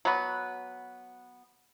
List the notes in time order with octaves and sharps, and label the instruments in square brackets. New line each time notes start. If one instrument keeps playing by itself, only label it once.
[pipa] F#3 B3